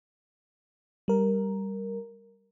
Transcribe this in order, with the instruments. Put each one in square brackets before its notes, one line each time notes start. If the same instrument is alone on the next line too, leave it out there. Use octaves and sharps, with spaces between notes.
[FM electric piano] G3 A#4